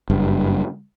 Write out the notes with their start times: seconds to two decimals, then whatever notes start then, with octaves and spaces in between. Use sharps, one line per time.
0.10 F#1 G2